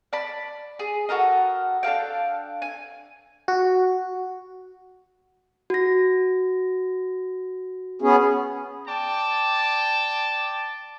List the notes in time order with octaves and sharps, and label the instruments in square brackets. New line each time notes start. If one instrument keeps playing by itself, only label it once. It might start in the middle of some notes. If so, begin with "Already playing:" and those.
[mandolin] D5 A5 B5
G#4
F#4 A4 A#4 D#5
D4 A4 F5 G5
G#5
[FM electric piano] F#4
[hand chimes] F#4 A#6
[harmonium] B3 C#4 G#4
[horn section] D5 G5 A5